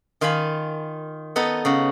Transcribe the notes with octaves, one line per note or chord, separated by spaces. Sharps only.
D#3 F4 F5 G#5 B5
B3 D#4 A4 B4
C#3 F#4